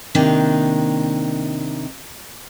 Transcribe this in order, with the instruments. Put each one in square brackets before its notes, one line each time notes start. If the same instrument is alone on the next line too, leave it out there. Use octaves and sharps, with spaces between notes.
[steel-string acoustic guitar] C3 D#3 A#3 D4 D#4